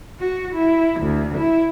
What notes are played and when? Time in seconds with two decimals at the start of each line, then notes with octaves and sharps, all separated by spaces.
0.20 F#4
0.53 E4
1.01 D2
1.37 E4